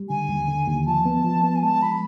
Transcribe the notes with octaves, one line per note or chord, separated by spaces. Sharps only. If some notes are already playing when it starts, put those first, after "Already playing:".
Already playing: G3
D3 G#5
D#2
D3
D#2
F3 A5
B3
F3
B3
G#5
G#3 A5
F3 B5